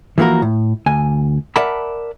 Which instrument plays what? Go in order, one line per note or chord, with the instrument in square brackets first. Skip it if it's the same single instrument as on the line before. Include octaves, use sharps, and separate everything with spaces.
[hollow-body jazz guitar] E3 F3 A#3 F#4 A#4
A2
D2 G#5
A#4 D5 E5 F#5 A5 B5